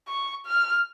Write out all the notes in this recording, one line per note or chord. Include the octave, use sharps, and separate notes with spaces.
C#6
F6